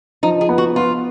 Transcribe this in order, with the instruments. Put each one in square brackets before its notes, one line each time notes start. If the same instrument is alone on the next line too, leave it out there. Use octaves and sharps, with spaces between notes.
[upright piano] F3 [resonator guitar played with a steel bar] D#4
[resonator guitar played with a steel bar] G#4
[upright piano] B3
[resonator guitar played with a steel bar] F#4
[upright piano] B3 [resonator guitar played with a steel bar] F4